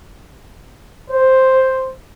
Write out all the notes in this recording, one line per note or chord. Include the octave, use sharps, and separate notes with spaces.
C5